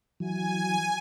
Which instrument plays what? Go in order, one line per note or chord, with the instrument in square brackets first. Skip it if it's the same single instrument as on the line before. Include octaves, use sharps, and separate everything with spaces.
[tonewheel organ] E3 F#3 [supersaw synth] G#5